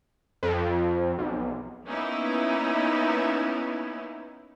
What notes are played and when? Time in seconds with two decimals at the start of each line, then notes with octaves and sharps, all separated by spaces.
0.43 F2
1.19 B1
1.87 A#3 B3 C#4 D#4 E4 B4